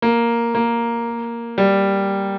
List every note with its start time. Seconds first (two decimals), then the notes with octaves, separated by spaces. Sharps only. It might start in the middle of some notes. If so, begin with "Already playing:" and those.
0.02 A#3
0.55 A#3
1.58 G3